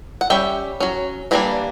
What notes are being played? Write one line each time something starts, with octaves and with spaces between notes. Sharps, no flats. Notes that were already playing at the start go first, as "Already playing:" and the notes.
F#5
G3 C#4 E5 G5
F#3 C#4
E3 G3 A#3 D4 A#5